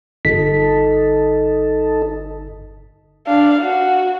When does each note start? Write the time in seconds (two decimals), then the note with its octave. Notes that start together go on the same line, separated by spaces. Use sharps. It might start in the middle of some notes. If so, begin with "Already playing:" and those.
0.25 G1 D#4 A4 B6
3.27 D4 F5
3.62 F#4